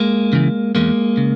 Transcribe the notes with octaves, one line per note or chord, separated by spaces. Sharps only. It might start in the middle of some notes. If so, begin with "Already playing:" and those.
Already playing: G#3 A#3
C#3 E3
E2 G#3 A#3
C#3